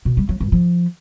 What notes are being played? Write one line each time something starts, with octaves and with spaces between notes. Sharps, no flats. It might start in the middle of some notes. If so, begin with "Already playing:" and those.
B2
G3
F#3
G2
F3